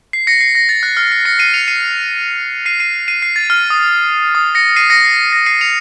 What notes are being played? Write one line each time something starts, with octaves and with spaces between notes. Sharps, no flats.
C7
A#6 C#7
C7
A#6
A6
F#6
F6
C7
A#6 C#7
C7 D#7
C#7 F7
C7 D#7
C7 D#7
C7 D#7
C7
C7 D#7
C7
A6
F6
D#6
D#6
A#6 C#7
C7 D#7
A#6 C#7
C7
A#6
C7 D#7
C#7 F7